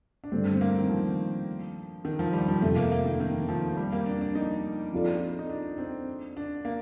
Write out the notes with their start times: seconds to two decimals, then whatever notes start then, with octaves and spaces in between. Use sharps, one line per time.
0.24 D4
0.32 G2 D3 A3 C4
0.54 C4
0.61 A#3
0.78 D#3
0.89 F3
2.05 D#3
2.19 F3
2.33 G3
2.48 F3
2.62 F2 C3 F3 A3
2.76 A#3
2.92 A#3
3.05 D#3
3.20 D#3
3.49 F3
3.77 G3
3.92 A#3
4.06 D4
4.21 D4
4.35 D#4
4.92 F3 C4 F4 A4 D5
5.39 D#4
5.50 D4
5.78 C4
6.37 D4
6.65 A#3